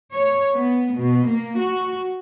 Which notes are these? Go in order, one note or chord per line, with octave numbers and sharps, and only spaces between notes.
C#5
B3
B2
A#3
F#4